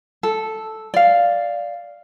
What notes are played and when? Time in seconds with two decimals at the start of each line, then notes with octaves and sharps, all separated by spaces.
0.23 A4
0.94 D5 F5